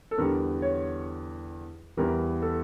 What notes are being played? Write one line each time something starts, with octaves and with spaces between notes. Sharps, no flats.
A4
E2 D3 G3 A#4
C#5
E2 E3 G3 A#4
A4